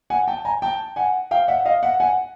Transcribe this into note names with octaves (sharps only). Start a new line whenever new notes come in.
F#5 G#5
G5 A5
G#5 A#5
G5 A5
F#5 G#5
F5 G5
E5 F#5
D#5 F5
E5 F#5
F#5 G#5